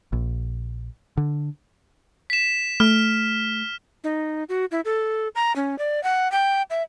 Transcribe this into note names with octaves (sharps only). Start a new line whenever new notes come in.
A#1
D3
B6 E7
A3 F6
D#4
F#4
E4
A4
A#5
C#4
D5
F#5
G5
E5